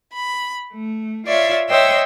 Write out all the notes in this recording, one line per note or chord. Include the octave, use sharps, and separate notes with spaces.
B5
A3
F4 C#5 D5 E5
C5 C#5 D#5 E5 G5 E6